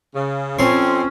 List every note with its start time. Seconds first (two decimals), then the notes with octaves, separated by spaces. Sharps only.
0.15 C#3
0.59 F2 C4 C#4 C#5 C6